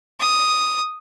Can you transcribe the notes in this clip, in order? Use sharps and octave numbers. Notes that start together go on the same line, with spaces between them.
D#6